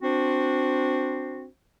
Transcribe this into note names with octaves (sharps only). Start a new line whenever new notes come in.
C4 D4 F#4 C5